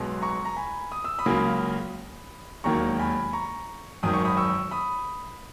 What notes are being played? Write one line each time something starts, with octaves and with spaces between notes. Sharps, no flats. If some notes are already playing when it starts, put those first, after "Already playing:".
Already playing: B1 B2 G#3 B3
A#5 C#6
A#5
G#5 B5
D#6
E6
B5 D#6
C#2 C#3 F#3 A#3
E1 D#2 D#3 F#3 A#3 A#5 C#6
G#5 B5
A#5 C#6
G#1 F#2 D#3 D#6
C#6
B5 D#6
C#6 E6
B5 D#6